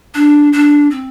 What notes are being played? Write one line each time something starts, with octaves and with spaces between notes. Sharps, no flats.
D4
D4
C4